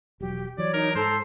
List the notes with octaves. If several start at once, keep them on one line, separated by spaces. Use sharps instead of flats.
E1 F#3 G4
E3 F#3 C#5 D5
D#4 A#4
G#2 A4 C5 A#5